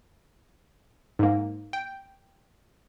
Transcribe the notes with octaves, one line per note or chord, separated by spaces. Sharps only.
G#2 A#3
G5